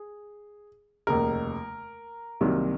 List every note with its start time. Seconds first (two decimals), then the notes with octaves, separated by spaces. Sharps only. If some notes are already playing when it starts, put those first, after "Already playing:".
Already playing: G#4
1.07 F1 D#2 C#3 A#4
2.41 C2 C3 D#3 F#3 A#3